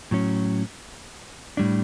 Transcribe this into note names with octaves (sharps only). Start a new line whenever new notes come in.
A2 F#3 C#4
A2 G3 D4